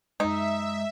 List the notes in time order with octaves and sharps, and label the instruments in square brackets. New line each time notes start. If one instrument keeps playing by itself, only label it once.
[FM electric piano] F#2 G#3 [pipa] D#4 [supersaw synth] E5